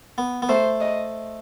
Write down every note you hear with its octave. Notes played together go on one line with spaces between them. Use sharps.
B3
B3
A3 C5
D#5